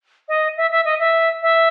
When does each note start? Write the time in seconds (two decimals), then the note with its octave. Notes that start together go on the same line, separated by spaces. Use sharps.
0.28 D#5
0.56 E5
0.71 E5
0.85 D#5
0.99 E5
1.42 E5